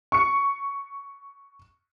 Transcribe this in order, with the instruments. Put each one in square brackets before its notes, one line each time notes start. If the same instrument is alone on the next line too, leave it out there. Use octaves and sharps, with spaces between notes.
[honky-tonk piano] C#6 C#7